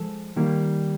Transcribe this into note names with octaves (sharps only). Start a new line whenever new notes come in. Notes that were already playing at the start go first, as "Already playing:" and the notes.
Already playing: F3 G#3 A4
D#3 G3 A#3